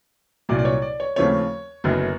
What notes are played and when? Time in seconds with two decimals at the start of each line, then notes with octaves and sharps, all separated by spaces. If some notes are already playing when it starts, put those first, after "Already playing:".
0.49 C2 A#2 F#3 D5
0.59 D5
0.65 C#5
0.82 D5
1.00 C#5
1.16 D#2 C#3 F3 A3 C4 C#5
1.84 F#1 F#2 D3 F#3 B3